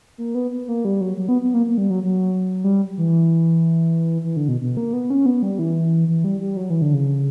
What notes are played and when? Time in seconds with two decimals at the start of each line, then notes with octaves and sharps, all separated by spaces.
0.18 A#3
0.35 B3
0.51 B3
0.68 A#3
0.85 G3
1.01 F#3
1.17 F#3
1.29 B3
1.42 B3
1.54 A#3
1.67 A#3
1.78 G3
1.90 F#3
2.03 F#3
2.64 G3
2.98 E3
4.24 E3
4.36 D3
4.48 B2
4.61 B2
4.77 A#3
4.93 B3
5.10 C#4
5.26 B3
5.42 G3
5.59 E3
6.08 E3
6.24 G3
6.41 G3
6.57 F#3
6.70 E3
6.82 D3
6.94 C#3